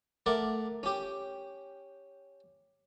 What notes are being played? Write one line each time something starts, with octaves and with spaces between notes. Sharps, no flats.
A3 A#4 D5 F#5
C#4 G4